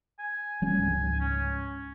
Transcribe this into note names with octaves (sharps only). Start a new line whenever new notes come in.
G#5
F3 G3 C#4 G#5
C#2 G#2 C#3
C#4